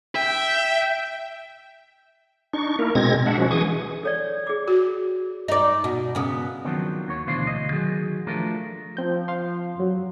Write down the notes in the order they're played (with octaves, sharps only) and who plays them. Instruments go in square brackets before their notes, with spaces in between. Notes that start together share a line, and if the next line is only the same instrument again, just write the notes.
[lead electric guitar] E5 [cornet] G5
[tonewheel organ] D4 D#4 C#6
A#3 E4 A#4
B2 G#3 C4 G#6 A#6
D4 E5 F#5
F3 G#3 C#4 F#4
E3 G#4 C#6 D#6
[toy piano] A4 C#5 D5
G#4 D6
[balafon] F#4
[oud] D#4 D5
B2
C#3 B3
[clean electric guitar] D#3 F3 F#3 B3 C4 D4
D#2 C#5
D2 B2 E3 D4 C5 F5
D2 D#5
D#3 F#3 G#4
F3 A3 D4 F4 A#4
[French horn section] F3 [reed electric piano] C4 G6
[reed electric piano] F5 C6
F#2 F#3